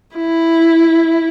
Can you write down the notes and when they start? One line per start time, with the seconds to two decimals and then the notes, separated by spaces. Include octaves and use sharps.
0.17 E4